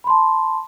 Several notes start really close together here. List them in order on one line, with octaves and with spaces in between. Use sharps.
B5 C6 A5